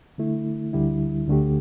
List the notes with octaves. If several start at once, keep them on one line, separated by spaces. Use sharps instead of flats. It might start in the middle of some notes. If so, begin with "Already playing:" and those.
D3 A3 E4
D2 D3 G3 E4
D2 D3 A3 G4